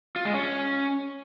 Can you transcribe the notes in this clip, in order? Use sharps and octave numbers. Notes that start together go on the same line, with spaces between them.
F4
G#3
C#4